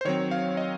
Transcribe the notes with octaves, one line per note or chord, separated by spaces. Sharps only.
C5
D#3 F#3 C4 C#5
F5
D#5